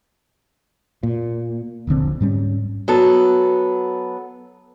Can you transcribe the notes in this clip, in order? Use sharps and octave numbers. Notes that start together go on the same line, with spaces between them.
A#2
D#1 A#1 D3 C4
G#2 G3 C#4
F#3 B3 A4